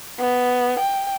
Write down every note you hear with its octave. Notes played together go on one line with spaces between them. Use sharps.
B3
G5